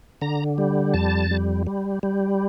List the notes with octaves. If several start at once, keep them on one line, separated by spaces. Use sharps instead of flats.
D3 A#5
G3
F2 A5
G3
G3
G3